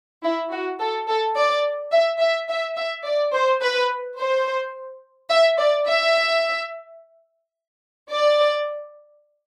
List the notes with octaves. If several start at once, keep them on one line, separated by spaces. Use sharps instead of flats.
E4
F#4
A4
A4
D5
E5
E5
E5
E5
D5
C5
B4
C5
E5
D5
E5
D5